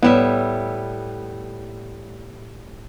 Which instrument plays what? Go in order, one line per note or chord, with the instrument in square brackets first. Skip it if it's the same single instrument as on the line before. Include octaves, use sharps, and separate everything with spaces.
[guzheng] A2 G3 E5 [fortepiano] B3